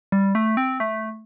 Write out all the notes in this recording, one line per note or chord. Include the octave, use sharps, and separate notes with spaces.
G3
A3
C4
A3